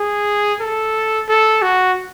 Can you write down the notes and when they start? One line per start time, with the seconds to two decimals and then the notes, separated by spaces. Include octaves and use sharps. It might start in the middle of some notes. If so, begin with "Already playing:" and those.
Already playing: G#4
0.60 A4
1.28 A4
1.62 F#4